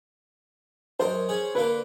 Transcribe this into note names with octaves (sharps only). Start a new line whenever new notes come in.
F#2 A#4 C5 D#5
C#4 G#4
D3 A#3 A#4 B4